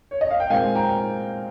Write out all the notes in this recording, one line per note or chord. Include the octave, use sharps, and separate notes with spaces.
C#5
D#5
F5
G5
A#2 G#3 C4 D#4 F5 G#5
G5 A#5